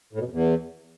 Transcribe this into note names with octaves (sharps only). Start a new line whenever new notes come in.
A2
B2
F2
E2